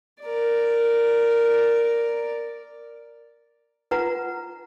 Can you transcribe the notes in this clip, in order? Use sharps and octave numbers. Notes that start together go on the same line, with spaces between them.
A#4 D5
F4 B4 F#5 A#5